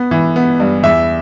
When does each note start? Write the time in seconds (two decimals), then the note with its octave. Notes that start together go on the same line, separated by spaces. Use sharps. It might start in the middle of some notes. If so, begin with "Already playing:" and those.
Already playing: B3
0.11 E3
0.36 B3
0.60 G2
0.83 E2 E5